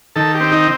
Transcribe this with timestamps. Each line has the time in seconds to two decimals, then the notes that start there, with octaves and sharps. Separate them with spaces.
0.16 D#3 A4
0.35 G4
0.40 C4
0.52 D#4